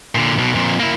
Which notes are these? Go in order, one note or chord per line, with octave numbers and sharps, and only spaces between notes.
A#2 D3
B1 B2
F2 A#2
A#3 E4